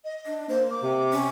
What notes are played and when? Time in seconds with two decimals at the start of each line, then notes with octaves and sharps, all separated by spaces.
0.04 D#5
0.26 D4
0.49 A#3 C5
0.70 D6
0.83 C3
1.12 C#4